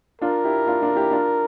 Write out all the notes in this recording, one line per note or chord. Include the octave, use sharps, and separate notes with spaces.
D4 F4 A#4
E4 G4
D4 F4
D4 F4
E4 G4
D4 F4